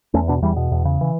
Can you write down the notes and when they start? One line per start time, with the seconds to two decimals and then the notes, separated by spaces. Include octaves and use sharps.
0.14 E2 A3 C#4
0.28 B2 B3 D4
0.42 E2 E3 G3
0.56 B2
0.72 E2
0.85 C#3
1.01 E3